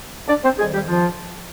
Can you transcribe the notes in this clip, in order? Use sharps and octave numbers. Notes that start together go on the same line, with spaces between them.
D4 D5
C4 C5
F2 D#3 G3 G#3 G#4
G3 G4
F3 F4